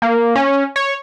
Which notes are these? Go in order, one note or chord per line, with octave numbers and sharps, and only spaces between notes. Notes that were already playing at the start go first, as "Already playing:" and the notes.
A#3
C#4
C#5